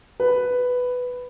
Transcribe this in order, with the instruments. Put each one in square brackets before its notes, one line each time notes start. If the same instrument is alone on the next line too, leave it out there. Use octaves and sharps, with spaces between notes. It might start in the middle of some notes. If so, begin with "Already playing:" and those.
[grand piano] B4